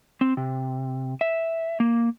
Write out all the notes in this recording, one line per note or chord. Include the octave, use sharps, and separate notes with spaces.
C4
C3
E5
A#3